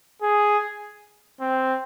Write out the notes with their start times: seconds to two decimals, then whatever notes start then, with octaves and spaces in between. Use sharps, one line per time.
0.22 G#4
1.40 C4